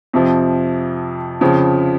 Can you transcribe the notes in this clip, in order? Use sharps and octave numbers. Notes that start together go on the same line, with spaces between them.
F2 C3 F3
F2 C#3 F3